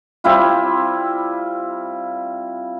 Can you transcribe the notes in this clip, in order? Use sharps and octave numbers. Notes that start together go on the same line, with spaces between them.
G3 C4 E4 F4